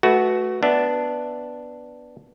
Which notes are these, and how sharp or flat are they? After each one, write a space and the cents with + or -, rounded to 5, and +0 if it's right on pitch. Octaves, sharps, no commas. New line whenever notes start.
A3 -25 F#4 +0 B4 +0
B3 +0 D4 +0 E5 +0